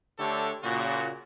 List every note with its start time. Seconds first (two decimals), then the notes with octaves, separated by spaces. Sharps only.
0.18 D3 A3 D4 G4 A4 C#5
0.63 A#2 C#3 F#4